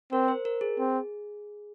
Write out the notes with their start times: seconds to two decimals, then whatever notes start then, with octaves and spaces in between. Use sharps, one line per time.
0.12 C4 A#4
0.28 C5
0.45 A#4
0.61 G#4
0.79 C4